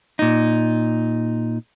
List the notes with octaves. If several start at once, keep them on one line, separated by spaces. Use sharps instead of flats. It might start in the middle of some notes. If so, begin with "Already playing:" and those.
A#2 D#4